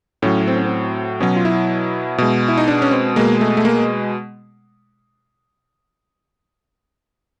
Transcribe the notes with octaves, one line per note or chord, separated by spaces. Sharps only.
A2 F#3 C#4
C4
C#4
C4
B2 F#3 C#4
F4
E4
B2 G#3
E4
D#4
D4
C#4
C4
B2 G#3 A#3
A3
A3
A#3